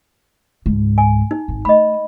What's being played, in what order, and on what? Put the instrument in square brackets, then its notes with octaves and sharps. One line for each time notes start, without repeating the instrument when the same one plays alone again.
[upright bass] C#2 G#2
[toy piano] G#5
D#4
[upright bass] G#1
[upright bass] A3 [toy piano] D#5 B5